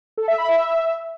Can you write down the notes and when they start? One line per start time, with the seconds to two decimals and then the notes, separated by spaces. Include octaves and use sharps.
0.18 A4
0.28 E5
0.38 B5
0.48 E5